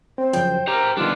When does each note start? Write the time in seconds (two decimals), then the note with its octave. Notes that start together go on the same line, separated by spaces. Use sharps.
0.18 C4 C5
0.33 F#2 C#3 F3 G5
0.68 G4 A#4 C5 A#5
0.97 B2 D#3 G3 D4 F4